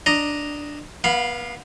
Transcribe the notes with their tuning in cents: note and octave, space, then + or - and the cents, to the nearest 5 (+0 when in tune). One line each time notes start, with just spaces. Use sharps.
D4 +0 D#5 +0 A#5 +0
B3 -35 F5 +0 B5 +0